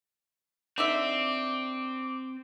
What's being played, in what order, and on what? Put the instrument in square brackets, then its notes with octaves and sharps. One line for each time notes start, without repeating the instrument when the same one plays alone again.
[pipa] D3 D#4 E5 [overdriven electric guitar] C4 [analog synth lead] D6